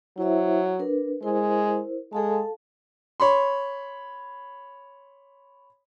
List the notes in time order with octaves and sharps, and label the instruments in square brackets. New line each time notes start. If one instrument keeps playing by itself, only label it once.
[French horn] F#3 [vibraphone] E4 C5 E5
[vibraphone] D4 A#4 B4
[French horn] G#3 [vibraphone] E4 A#4 C5
[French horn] G#3 [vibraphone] A4 F5 A5
[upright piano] C#5 B5 C6